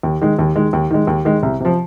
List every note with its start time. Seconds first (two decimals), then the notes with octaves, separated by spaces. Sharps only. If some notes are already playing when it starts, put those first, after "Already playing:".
0.03 D#2
0.21 D#3 G#3
0.39 D#2
0.56 D#3 G#3
0.73 D#2
0.91 D#3 G#3
1.07 D#2
1.25 D#3 G#3
1.43 C2
1.60 C3 F3